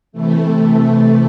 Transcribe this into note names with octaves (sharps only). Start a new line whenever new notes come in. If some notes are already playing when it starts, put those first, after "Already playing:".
C3 E3 A3